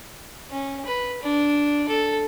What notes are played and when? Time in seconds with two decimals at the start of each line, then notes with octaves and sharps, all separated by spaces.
0.51 C#4
0.86 B4
1.22 D4
1.88 A4